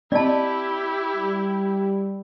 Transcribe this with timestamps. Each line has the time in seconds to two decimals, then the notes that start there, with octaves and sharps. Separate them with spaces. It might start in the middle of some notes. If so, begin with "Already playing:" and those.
0.12 C4 E4 G4 D5 D#5 A5
1.16 G3